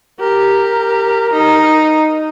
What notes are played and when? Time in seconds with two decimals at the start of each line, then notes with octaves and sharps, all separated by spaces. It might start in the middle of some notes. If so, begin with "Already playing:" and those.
0.20 G4 A#4
1.33 D#4